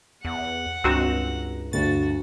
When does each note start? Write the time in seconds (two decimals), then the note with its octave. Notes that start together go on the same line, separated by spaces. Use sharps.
0.25 E2 F#5
0.84 C#2 G2 C4 F#4 A#5 E7
1.73 D2 G2 F#4 A6